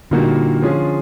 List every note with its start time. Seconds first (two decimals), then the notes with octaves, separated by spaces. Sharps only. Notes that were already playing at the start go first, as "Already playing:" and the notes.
0.11 A#2 D3 G3 A#3 D#4 F#4
0.62 F3 G#3 C#4 F4 G#4